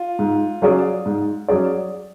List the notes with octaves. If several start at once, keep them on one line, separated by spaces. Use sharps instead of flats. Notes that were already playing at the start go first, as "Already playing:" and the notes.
Already playing: F4
G#2
F#3 C#4 G#4 D5
G#2
F#3 C#4 G#4 D5